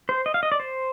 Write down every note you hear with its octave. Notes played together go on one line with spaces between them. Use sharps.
C5
D#5
F5
D#5
D5
C5